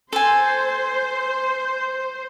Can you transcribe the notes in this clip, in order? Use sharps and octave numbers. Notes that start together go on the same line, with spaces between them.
A4 C5 G#5